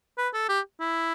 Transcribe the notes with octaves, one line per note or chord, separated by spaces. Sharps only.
B4
A4
G4
E4